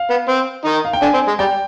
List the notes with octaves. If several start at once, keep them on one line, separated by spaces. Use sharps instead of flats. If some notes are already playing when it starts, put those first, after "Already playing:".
Already playing: F5
B3
C4
D#3 D#4
F5
G5
D3 D4 G#5
C4
G#3
G3 G5